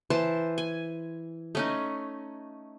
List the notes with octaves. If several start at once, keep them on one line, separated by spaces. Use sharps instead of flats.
E3 C5 A5
G#5
A3 C#4 D#4